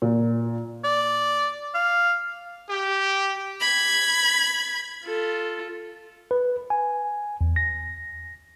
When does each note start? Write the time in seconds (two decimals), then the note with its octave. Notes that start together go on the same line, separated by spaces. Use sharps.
0.02 A#2
0.84 D5
1.75 F5
2.70 G4
3.60 B5 G#6
5.05 F4 A4
6.31 B4
6.70 G#5
7.41 E2
7.56 A#6